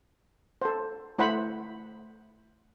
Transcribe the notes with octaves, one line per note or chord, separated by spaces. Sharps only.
A4 C5
A3 E4 C5 F#5 B5